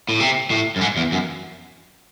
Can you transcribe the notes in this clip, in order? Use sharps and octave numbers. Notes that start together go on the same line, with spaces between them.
A2
C3
A2
F#2
G#2
E2
F#2